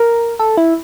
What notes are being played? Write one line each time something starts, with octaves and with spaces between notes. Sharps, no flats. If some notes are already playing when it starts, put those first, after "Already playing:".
Already playing: A#4
A4
E4